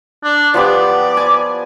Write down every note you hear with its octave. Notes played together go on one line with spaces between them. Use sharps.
D4
F3 B3 G4 D5
G#5